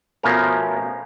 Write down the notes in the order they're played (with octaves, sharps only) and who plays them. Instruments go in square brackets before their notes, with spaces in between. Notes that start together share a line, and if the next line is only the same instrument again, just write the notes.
[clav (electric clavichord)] B2 F3 A3 C#4 A#4